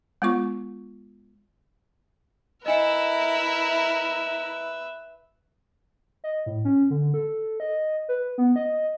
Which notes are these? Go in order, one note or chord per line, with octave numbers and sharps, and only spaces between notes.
G#3 B3 F4 C#6
E4 A#4 B4 D#5 E5 G#5 C#7
D#5
A2
C#4
D3
A4
D#5
B4
B3
D#5